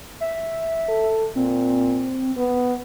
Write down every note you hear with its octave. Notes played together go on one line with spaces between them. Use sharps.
E5
A4
A#2 C4
B3